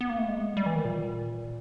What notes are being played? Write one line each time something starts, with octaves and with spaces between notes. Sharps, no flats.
B3
A#3
A3
G#3
G3
E3
D#3
A#2